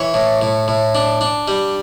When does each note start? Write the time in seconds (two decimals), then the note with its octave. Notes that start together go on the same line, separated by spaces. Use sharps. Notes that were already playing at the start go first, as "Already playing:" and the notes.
Already playing: E3 C#5
0.14 A2
0.42 A2
0.68 A2
0.95 D4
1.21 D4
1.48 G3